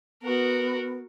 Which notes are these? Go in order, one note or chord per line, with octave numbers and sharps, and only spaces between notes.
B3 F#4 A#4